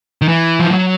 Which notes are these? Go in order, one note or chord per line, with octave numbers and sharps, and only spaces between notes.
D#3
E3
F3
F#3